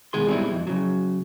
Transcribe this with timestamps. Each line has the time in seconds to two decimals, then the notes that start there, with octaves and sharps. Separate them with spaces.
0.13 B2 D#3 G#3 G#4 C6
0.27 G#2 B2 G3 C4 D#4 E4
0.51 F2
0.67 C#3 F#3